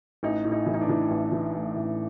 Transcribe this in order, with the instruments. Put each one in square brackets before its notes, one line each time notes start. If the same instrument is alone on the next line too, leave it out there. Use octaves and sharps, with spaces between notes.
[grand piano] A1 D#4
A2
D#4
E3
D#4
D4
E3
A1
E3
A2
A1